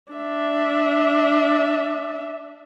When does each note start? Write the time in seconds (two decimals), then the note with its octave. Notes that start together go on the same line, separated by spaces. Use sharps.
0.12 D4 E5